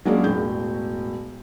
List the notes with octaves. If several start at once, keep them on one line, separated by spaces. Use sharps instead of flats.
F#3 G#3 A#3 C#4 D4 F4
E1 A2 G6